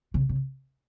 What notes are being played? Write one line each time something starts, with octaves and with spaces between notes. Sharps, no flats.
C#3
C#3